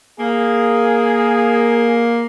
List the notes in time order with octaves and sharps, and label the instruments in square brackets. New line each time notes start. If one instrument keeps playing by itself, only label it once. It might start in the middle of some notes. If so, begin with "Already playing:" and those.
[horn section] A#3 [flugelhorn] G#4